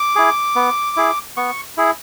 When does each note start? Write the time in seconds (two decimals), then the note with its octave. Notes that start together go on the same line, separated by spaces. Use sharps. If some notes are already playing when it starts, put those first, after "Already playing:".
Already playing: D6
0.16 E4 G#4
0.56 B3
0.97 E4 G#4
1.37 B3 C#6
1.77 E4 G#4